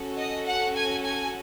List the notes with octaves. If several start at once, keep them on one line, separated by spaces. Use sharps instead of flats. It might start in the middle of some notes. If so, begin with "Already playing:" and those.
Already playing: C#4 F#4 A4
D#5
F#5
G#5
G#5